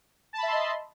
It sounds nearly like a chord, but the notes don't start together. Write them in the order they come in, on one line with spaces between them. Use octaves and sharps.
A5 B5 E5 C6 D#5